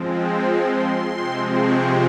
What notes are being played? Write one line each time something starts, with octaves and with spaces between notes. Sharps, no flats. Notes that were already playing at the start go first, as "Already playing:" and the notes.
Already playing: F3 G#3 C4
C6
C6
C3 F3 G#3 C4
C#6